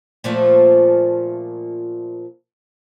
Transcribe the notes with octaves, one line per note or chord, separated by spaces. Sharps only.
A#2 F3 A3